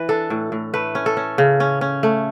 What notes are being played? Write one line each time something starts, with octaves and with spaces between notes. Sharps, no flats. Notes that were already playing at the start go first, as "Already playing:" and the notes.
Already playing: E3 B4
D4 A4
A2
A2
A3 B4
C#4
A4
C#4
C#3
C#4
C#4
A3